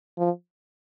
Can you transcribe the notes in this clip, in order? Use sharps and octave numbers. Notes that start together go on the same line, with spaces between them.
F3